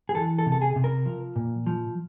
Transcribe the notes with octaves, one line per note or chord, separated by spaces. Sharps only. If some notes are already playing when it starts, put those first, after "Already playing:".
G#4
E3 A4
A4
C3
A4
G#4
C3
A#4
F3
A#2
F3